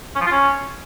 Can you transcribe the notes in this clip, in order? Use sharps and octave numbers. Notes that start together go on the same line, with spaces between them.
C#4
F3
F4
C#4